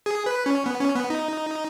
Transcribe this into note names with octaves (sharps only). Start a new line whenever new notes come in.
G#4
B4
C#4
B3
C#4
B3
D#4